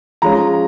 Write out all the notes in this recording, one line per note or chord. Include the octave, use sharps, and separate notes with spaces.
F3 G#3 C#4 A#5